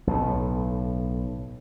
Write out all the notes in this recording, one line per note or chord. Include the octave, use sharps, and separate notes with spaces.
B1 A2